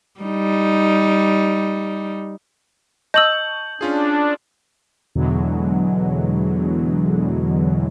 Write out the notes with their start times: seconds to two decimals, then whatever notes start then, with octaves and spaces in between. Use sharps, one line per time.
0.21 G3 D#4
3.14 D#5 A5 C#6 D#6 E6 G6 F#7
3.81 C#4 D4 F4 G#4
5.15 E2 B2 D3 E3 F#3 G#3